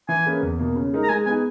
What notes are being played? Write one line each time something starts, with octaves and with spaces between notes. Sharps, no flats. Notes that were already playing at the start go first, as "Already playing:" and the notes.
E3 G#5
A#3 C#4 G#4 B4
E2
B2 A#3
C#3
G#3 D#4 A#4
A#5
G#3 G#5
B3 D#4 G#4 G#5